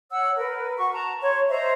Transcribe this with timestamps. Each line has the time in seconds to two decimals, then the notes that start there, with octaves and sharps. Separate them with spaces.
0.12 C#5 F#5 E6
0.37 A#4 B4
0.78 F#4 C#6
0.92 A5 A#5
1.22 C#5 C6 C#6
1.49 C5 D#5 E5 A#5